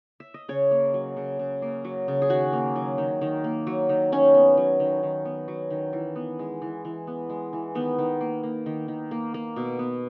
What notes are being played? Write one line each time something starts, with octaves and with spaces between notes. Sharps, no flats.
E5
D#5
C#3 C#5
A#3
F#3
C#3
C#3
A#3
F#3
C#3
G#4
D#3 F#4
A#3
F#3
D#3
D#3
A#3
F#3
D#3
D#3 C#4
B3
F#3
D#3
D#3
B3
F#3
D#3
E3
B3
G#3
E3
E3
B3
G#3
E3
D#3 B3
D#3
A#3
A#3
D#3
D#3
A#3
A#3
B2
B3